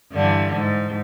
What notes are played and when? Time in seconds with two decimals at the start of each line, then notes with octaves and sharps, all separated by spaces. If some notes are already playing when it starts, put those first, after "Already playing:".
0.12 G2 D3 E3
0.54 G#2